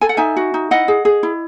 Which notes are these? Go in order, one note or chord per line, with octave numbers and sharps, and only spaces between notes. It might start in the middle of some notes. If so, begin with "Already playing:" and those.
A4 G#5
F#5
D#4 E5 G#5
F#4
D#4
E4 D#5 F#5
G#4
G#4
E4